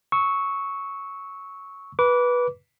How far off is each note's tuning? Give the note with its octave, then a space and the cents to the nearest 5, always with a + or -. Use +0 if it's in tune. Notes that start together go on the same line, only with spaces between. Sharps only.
C#6 +0 E6 -25
B4 -15 D6 -25